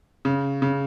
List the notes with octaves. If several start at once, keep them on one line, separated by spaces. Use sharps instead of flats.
C#3
C#3